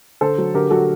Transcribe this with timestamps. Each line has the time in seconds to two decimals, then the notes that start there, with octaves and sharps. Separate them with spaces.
0.21 D3 A4 C5
0.38 F#3
0.54 D3 G4 A#4
0.71 F#3 F#4 A4